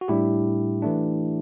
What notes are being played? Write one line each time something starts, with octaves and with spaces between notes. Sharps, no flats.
F#4
A2 G3 D4 E4 G4
E3 A3 D4